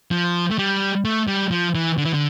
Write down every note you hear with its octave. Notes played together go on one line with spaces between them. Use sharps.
F3
A3
G3
A3
G3
F3
E3
D3
E3
D3